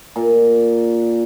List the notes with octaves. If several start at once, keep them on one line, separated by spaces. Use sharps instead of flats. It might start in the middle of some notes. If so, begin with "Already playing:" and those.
A#2